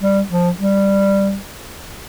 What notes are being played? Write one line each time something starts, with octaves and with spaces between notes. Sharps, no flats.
G3
F3
G3